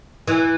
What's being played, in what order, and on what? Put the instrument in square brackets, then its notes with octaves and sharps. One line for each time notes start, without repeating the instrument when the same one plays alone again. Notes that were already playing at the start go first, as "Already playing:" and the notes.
[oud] E3